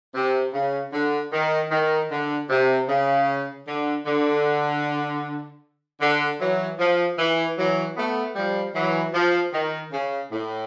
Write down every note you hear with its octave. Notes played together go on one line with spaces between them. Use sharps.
C3
C#3
D3
D#3
D#3
D3
C3
C#3
D3
D3
D3
E3 F#3
F3
E3
E3 F#3
A3 B3
F3 G3
E3 F#3
F3
D#3
C#3
A2